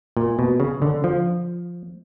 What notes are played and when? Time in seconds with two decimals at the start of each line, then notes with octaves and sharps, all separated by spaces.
0.17 A#2
0.39 B2
0.60 C#3
0.82 D3
1.04 F3